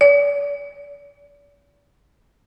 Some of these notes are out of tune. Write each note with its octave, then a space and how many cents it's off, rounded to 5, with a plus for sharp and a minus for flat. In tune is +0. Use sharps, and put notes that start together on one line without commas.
D5 -45